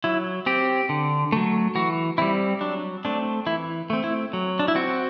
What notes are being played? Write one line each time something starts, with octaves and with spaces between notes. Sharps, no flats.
F#3 E4
C4 G4
D3
F#3 A3
E3 F#4
G3 C4 E4
F#3 D4
A3 C4 D4
E3 E4
A3 C4
E4
F#3
D4
E4
C4 F#4